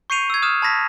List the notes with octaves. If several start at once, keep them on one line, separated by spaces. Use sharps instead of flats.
C#6 G6 C7 C#7 D#7 F7
E6 G#6
D#6 F6 E7
A5 B5 G#6 A#6 B6